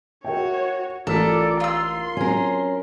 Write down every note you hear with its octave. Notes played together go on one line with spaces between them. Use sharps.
F#4 A#4 C#5 E5 G5
A1 F4 A4 A#4 D5 B6
F4 C6 E6
F#3 C4 C#4 A#4